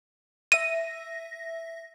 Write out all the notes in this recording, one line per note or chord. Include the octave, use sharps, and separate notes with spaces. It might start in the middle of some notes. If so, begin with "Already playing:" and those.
E5 A#6 D#7